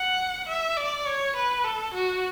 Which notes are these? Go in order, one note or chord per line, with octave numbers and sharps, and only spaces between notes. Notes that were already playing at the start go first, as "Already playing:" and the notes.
Already playing: F#5
E5
D5
C#5
B4
A4
F#4